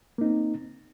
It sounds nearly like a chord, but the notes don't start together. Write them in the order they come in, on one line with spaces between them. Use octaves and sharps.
A#3 D#4 C4